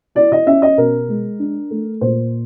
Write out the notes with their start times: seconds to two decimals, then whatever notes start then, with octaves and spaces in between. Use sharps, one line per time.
0.15 E4 D5
0.32 D#5
0.46 C#4 E5
0.62 D#5
0.78 B2 A#4
1.08 G#3
1.39 D4
1.71 A3
2.01 A#2 C5